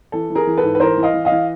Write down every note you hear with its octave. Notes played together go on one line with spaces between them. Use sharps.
E3 A4
E3
G#4 A#4
E3
A4 B4
G#2
B4
E3 A#4 C5
E3
D#5 F5
E3
D#5 F5
E3